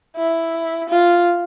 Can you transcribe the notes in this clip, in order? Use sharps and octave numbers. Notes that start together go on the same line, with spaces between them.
E4
F4